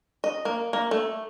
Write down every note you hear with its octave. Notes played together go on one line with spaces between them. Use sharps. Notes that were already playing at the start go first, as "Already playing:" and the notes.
D#5
A#3
A#3
A3